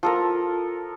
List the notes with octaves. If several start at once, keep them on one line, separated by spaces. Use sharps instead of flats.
F3 A4 A#4